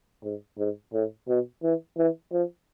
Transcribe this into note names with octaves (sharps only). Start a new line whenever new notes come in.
G#2
G#2
A2
B2
E3
E3
F3